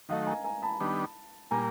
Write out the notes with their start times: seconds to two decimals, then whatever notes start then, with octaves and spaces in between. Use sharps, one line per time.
0.09 D#3 F#3 A3 D#5 F5
0.26 G#5 A#5
0.44 G#5 A#5
0.62 A5 B5
0.80 D#3 G3 B3 D4
1.51 A#2 G3 A#3 G#5 A#5